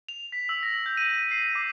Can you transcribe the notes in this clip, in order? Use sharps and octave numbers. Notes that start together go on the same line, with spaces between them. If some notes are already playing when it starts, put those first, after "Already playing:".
F7
B6
E6
A#6
G6
D#7
C7
D6